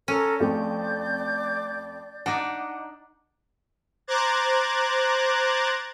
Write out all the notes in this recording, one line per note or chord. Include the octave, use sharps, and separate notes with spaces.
C#4 A4 A#4 C#5
F2 A3 C4 D5 G6
D4 D#4 F#5 D6
C5 A#5 D6 F#6 G#6 A6